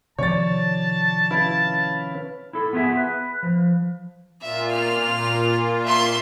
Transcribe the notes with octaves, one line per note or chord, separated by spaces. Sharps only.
C3 D#3 F3 C#5 D5 A5 A6
C#4 E4 B4 F5
E4 A4
B3 F4 G#4 E5
B4
F3
A#2 F4 E5
F6
E5 C6